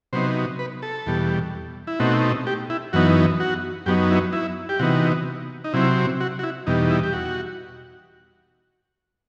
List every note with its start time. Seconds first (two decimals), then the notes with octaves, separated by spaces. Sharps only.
0.13 C3 F#3 B3 D#4 C5
0.59 B4
0.82 A4
1.06 E2 B2 G3
1.87 E4
2.00 B2 A3 C4 D#4 F#4
2.47 G4
2.70 E4
2.93 F#2 E3 B3 D#4 F#4
3.40 F#4
3.86 F#2 F#3 B3 D#4 G4
4.10 E4
4.33 E4
4.69 G4
4.79 C3 E3 B3 D#4 F#4
5.64 D#4
5.73 C3 F#3 C4 E4
6.20 F#4
6.39 F#4
6.43 E4
6.67 E2 B2 G3 D#4
6.90 E4
7.03 G4
7.13 F#4